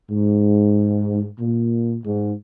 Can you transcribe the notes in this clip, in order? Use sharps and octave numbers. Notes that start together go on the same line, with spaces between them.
G#2
A#2
G#2